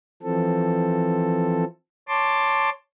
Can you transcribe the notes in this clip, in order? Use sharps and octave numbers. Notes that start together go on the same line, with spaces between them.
E3 F3 C4 A4
C#5 A5 C6 D6